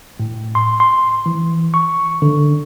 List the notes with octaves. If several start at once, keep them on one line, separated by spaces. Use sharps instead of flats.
A2
C6
C6
E3
C#6
D3